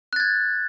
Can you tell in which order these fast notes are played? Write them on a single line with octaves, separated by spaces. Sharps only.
F#6 A6 G#6